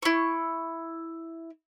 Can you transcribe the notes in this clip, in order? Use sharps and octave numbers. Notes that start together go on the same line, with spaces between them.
E4 C#6